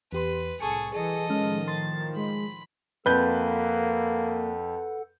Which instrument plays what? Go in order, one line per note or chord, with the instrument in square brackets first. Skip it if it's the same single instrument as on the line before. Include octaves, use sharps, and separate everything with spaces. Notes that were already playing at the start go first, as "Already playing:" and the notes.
[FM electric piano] E2 G4 C6 [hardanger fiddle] B4
[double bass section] C2 A2 [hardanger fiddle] G#4 A4 [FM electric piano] C#6 C#7
[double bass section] E3 [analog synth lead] G#4 [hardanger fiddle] A4 D#5
[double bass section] A2 D#3 F3 [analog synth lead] G#3 [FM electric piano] C#4 F6
[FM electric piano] C6 [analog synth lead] A6
[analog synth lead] G#3 [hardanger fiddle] B5
[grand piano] F2 G6 [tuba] A#3 [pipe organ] A4 F#5 [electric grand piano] B4